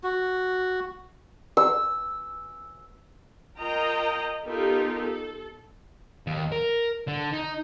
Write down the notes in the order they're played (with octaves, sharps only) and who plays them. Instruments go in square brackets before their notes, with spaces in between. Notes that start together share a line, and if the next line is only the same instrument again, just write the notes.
[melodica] F#4
[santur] E6
[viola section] F4 A#4 D#5 G5 A#5
B3 D#4 F4 G4 A4 A#4
A4
[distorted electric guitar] D#2
A#4
D3
D#4